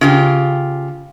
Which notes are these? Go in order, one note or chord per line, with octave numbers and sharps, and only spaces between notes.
C#3 F4 G4